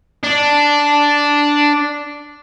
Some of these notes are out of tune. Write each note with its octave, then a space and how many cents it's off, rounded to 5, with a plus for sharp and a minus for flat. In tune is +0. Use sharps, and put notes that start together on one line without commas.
D4 -5